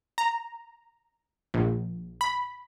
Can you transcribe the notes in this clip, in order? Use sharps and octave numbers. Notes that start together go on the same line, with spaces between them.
A#5
A#1
B5